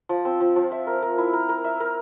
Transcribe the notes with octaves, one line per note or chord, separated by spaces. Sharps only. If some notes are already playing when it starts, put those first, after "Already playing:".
F3
C4
F3
F3
E5
A#4
A#4
E4
A#4
A#4
E5
A#4